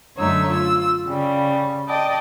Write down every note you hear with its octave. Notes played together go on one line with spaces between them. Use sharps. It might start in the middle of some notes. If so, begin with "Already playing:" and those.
F#2 D3 A3 D#4 C#5 E6
F4 E6
C#3 G3
D5 D#5 G5 A5